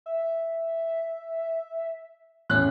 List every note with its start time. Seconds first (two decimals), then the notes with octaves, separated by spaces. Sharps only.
0.06 E5
2.50 E2 A2 C#4 F#6